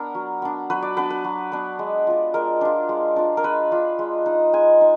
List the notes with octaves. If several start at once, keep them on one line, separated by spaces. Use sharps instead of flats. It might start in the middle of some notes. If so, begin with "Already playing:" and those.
Already playing: B3 D4 A#4
F#3
B3 D4
F#3 B4
D5
B3 D4 B4
B4
F#3
B3 D4
G#3
D4 F4
G#3 A#4
D4 F4
G#3
D4 F4
A#4
G#3 B4
D4 F4
G#3
D#4
G#3 G#5
D#4